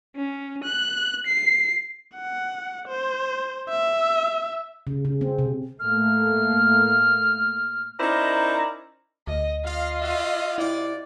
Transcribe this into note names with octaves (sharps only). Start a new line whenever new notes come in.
C#4
F#6
C7
F#5
C5
E5
C#3
C#3
C4
C3
A2 A3 A#3 F6
C#4 D#4 E4 A#4 C5 D5
D2 D#5
F4 D#5 F5
F#4 E5 F5
C3 E4 D5